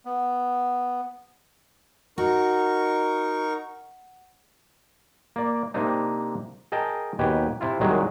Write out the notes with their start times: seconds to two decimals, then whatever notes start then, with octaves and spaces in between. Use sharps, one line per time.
0.05 B3
2.18 D#4 F#4 A#4 C#6
5.36 A#3 D5
5.74 C3 A#3 C4 D4 D#4
6.72 G#4 A#4 D#5 G5 A5
7.19 D#2 B2 G4 B4 G5 G#5
7.61 C3 E4 F4
7.80 C2 D#3 F#3 G#3 G4 G#4